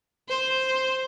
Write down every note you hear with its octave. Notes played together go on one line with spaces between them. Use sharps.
C5